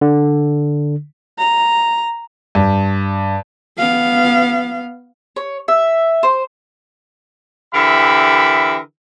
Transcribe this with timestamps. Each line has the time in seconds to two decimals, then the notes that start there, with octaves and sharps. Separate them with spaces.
0.01 D3
1.39 A#5
2.55 G2
3.78 B3 F5
5.36 C#5
5.68 E5
6.23 C5
7.74 D3 E3 G4 A#4 E5 B5